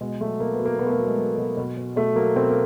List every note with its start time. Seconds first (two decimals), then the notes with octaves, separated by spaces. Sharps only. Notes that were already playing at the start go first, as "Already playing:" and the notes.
0.01 B2 G#3
0.20 F#3 A3
0.39 B2 A#3
0.53 B3
0.59 F#3
0.65 A#3
0.79 B2 B3
0.86 A3
0.91 A#3
0.98 F#3
1.05 G#3
1.18 F#3
1.38 B2
1.57 B2
1.77 B2
1.96 B2 A3
2.16 F#3 A#3
2.36 B2 C4
2.49 A#3